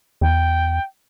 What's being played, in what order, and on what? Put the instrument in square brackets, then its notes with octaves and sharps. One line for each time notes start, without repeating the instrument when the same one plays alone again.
[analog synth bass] E2 [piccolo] G5